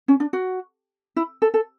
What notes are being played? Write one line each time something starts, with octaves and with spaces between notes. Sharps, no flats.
C#4
D4
F#4
E4
A4
A4